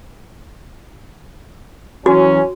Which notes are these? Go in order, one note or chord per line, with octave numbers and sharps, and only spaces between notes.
E3 F#3 C#4 F#4